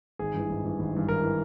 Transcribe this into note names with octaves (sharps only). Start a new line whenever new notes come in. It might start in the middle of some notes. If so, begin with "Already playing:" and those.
G#1 G#4
G2 E3
G#1
G2 E3
G#1
G2 E3
G#1 A#4
E3